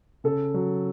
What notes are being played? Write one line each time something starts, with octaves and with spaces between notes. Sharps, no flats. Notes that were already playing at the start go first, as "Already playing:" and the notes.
C#3 A4
F#3